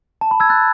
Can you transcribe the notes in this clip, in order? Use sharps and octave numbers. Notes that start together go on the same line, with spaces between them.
A5
B5
E6 G#6
F#6 A6